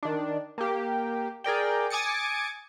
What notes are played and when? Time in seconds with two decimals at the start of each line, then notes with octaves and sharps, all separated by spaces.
0.03 D#3 D4
0.58 A#3 G4
1.44 G#4 A#4 D5 G5
1.90 G#5 D6 D#6 A6 C#7